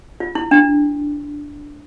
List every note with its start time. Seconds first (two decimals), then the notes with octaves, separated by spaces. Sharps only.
0.20 F4
0.35 E4
0.51 D4